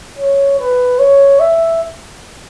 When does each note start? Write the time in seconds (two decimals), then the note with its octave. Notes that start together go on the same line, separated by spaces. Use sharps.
0.19 C#5
0.60 B4
0.99 C#5
1.40 E5